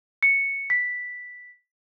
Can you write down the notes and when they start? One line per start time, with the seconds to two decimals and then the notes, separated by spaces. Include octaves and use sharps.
0.23 C#7
0.70 B6